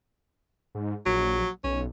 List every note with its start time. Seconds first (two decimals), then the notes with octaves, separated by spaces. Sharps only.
0.75 G#2
1.06 A#1 F#3
1.64 B1 C#4